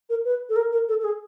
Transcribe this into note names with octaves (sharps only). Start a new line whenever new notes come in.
A#4
B4
A4
A#4
A#4
A4
A4
G#4